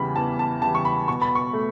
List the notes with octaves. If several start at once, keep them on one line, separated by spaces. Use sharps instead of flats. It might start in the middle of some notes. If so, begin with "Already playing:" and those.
Already playing: E2 C#3 E3 G3 B5
E2 A5
A5
C#3 E3 G3 A5
C#6
B5
B2 C#6
B5
C#6
A3